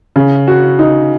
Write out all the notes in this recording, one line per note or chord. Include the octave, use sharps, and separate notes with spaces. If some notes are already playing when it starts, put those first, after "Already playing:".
C#3
F#4
D#4